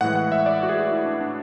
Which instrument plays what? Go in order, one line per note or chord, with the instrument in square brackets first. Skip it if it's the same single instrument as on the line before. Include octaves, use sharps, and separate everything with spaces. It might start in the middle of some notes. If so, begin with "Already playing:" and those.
[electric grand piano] A2 E3 G#3 F#5
F#5
E5
D5
F#4
G#4
F#4
E4
D4
D4